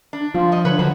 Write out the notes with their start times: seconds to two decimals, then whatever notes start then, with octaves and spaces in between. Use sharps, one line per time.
0.13 D4
0.34 F3 F4
0.52 G2 D#5
0.65 D3 B4 C#5
0.79 F3 F#3